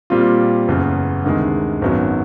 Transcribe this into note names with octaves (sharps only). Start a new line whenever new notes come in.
A#2 G3 C4 F4
F#1 E2 C#3
D2 C3 D#3 G#3
G#1 F#2 D#3 F#3 B3